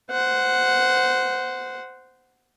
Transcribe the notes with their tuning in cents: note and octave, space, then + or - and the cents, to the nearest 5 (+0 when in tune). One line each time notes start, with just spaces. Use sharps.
C5 -15 F#5 +0